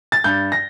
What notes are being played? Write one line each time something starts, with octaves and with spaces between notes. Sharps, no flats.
A6
G2 G6
A#6